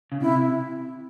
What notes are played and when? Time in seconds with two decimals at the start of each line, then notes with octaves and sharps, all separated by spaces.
0.12 C#3
0.21 C3 E4